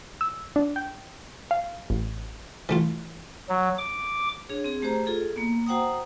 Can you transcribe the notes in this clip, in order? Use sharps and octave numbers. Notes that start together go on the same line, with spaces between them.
E6
D4
G5
F5
A1
E3 A3 F4
F#3
D6
D4 G#4 C#5
C4 G#4
A3 G4 G#4 C5 A#5
F4 G#4 A4
A#3 B3
F#4 C5 F#5 G5 A#5 D#6